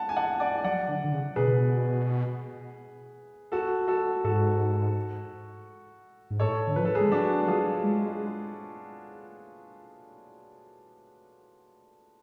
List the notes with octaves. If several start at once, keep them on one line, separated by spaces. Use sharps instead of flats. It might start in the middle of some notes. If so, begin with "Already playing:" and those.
Already playing: F#5 A5
G#5
F#5 A5
D5 F#5
F#3 D5 F#5
D3
D3
C#3
B2 G#4 B4
F#4 A4
F#4 A4
G#2 F#4 A4
G#2
A2 A4 C#5
D3
F3 B4
A4
G#4 B4
G#3
F#3 D4 F#4
F#3 F4 G#4
G#3